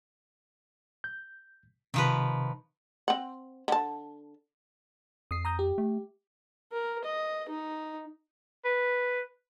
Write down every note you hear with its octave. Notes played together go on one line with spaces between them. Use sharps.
G6
C3 D#3 F3 B4
C4 F#5
D3 A5
F2 D#6 C7
A#5 D#6 G6
G4
A3
A#4
D#5
D#4
B4